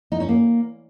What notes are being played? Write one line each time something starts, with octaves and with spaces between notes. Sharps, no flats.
D#4
C#4
A#3